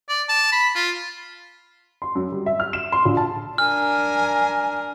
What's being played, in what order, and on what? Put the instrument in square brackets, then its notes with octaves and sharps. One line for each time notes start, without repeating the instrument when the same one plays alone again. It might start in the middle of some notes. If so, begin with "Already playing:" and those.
[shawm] D5
A5
B5
F4
[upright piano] C6
F#2
G3
E5
F6
E7
C6
A#1
A5
[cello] D4 A#4 [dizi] G#5 [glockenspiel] F6